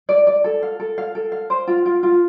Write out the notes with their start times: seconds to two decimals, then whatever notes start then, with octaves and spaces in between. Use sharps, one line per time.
0.09 D5
0.27 D5
0.44 A4
0.63 F5
0.80 A4
0.98 F5
1.15 A4
1.32 F5
1.50 C5
1.67 F4
1.86 F4
2.03 F4